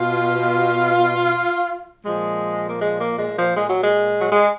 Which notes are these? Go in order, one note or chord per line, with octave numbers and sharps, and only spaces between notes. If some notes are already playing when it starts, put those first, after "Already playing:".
Already playing: B2 F4
A#2 F3 G#3
A#3
G#3
A#3
G#3
F3
G#3
F#3
G#3
F#3
G#3